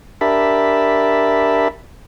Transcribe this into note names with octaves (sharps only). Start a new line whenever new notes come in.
D4 G4 A#4 E5 A5 B5